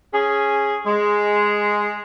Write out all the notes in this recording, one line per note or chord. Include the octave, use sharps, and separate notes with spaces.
C#4 G#4
G#3